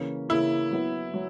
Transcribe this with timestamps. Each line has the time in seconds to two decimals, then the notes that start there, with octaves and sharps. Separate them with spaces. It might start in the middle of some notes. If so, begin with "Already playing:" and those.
Already playing: C#3 E3 A#3 C#4
0.29 C#3 E3 A#3 C#4 E4
0.71 F#3 B3 E4
1.14 F#3